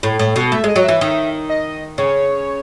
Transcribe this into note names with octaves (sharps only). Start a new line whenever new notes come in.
A2
A2
B2
A3 E5
G#3 D#5
F#3
E3 E5
D#3
D#5
C#3 C#5